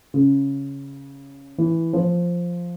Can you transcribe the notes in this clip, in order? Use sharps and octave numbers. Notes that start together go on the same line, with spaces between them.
C#3
E3
F3